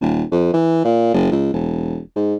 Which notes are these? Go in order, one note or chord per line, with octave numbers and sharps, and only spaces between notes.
D#1
F2
E3
A#2
F#1
C#2
E1
G#2